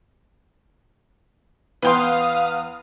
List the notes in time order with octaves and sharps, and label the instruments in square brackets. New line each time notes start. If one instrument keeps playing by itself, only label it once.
[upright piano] E2 B3 [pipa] B4 G5 C6 [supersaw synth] F5 D#6